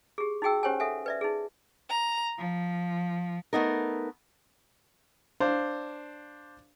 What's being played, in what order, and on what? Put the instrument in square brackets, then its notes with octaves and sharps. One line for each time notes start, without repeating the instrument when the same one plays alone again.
[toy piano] G4 G#4
D#4 F#4 G#4 G5 E6
C#4 G4 C5 C#5 G5 G#5
A4 E5 F#5 G#5
B4 D5 E5
D#4 G#4
[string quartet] A#5
F3
[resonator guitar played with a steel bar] A3 B3 D#4 A#4
[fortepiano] D4 C5 F5